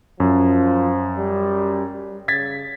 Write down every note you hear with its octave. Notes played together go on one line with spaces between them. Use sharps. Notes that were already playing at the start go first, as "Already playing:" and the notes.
F#2 F3
G3
G3
C#3 G#6 A6 B6